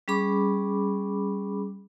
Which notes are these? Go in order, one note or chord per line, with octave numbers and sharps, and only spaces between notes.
G3 C#4 G#4 B5 D6